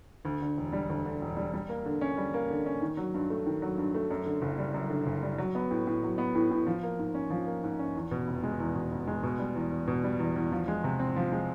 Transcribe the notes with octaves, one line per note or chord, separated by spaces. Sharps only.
D2
D3
E1
G3
D2
D3
E1
G3
G3
A#3
D3
C#4
G3
A#3
D3
C#4
D#3
F#3
G2
A3
D#3
F#3
G2
A3
F#2
D3
F#1
G3
F#2
D3
F#1
G3
F#3
B3
A2
A2
F#3
B3
A2
A2
F3
A#3
G#2
C#4
F3
A#3
G#2
C#4
E2
B2
F1
G#3
E2
B2
F1
G#3
B2
G3
E2
E2
B2
G3
E2
E2
F3
G#3
C3
C4
F3
G#3